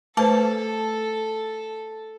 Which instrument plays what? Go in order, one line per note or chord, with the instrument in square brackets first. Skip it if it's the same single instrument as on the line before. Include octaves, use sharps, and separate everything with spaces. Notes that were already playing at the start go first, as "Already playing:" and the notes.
[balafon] A3 B4 C5 [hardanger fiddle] A4 [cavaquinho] A5